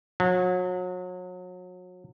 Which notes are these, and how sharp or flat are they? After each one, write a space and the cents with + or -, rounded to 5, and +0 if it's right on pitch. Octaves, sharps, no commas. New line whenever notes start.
F#3 -30